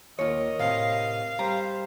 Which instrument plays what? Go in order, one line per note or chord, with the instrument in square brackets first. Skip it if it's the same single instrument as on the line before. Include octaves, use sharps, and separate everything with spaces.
[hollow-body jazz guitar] D#2 F4 [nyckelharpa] A#4 D#5 [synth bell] C#5
[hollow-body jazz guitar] A2 C3 [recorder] F5
[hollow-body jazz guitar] G3 [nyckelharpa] C5 [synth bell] A#5